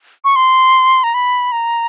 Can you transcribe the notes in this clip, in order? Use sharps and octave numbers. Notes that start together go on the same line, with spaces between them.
C#6
C6
A#5
B5
A#5